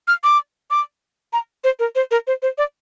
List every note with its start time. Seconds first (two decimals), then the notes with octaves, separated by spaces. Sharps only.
0.08 F6
0.24 D6
0.71 D6
1.33 A#5
1.64 C5
1.79 A#4
1.95 C5
2.11 A#4
2.27 C5
2.42 C5
2.58 D5